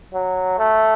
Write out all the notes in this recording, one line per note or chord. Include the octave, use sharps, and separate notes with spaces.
F#3
A3